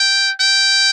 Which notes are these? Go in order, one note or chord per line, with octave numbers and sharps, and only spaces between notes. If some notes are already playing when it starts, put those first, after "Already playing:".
Already playing: G5
G5